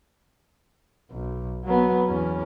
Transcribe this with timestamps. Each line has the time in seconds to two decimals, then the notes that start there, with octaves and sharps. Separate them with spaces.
1.11 B1
1.65 F#3 B3
2.06 E2 C#4